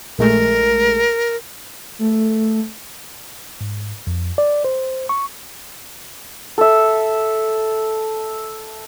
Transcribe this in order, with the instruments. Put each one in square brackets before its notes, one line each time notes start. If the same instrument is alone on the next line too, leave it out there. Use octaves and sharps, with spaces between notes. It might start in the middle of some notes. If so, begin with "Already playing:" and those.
[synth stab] A#1 G#3 A3 [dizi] A#4
[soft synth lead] A3
[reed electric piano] G#2
F2
D5
C5
C#6
[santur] A4 E5